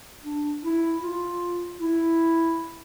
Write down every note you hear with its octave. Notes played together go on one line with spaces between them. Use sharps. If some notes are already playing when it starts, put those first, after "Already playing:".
D4
E4
F4
E4